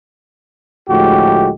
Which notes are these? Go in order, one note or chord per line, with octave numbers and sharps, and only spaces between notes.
D2 A2 F3 G#3 F#4 G4